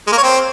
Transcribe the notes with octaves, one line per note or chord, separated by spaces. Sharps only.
G#3
A#3
C#5
C4